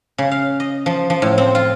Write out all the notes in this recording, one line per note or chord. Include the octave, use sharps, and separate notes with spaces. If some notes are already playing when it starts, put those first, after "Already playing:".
C#3
F5
D#5
F3
F3
A2
C4
F4